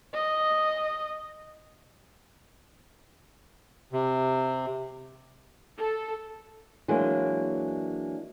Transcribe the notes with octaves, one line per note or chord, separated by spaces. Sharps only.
D#5
C3
A4
E3 F#3 G#3 A#3 D4